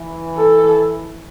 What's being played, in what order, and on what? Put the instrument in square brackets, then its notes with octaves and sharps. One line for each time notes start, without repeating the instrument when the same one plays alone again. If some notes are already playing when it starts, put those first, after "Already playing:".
Already playing: [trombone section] E3
[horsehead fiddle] A4